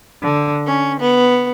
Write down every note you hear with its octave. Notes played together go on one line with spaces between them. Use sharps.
D3
C#4
B3